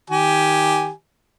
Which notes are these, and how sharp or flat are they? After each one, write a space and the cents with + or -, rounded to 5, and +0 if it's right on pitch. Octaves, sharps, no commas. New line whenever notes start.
D#3 +10 G4 +0 G#5 +5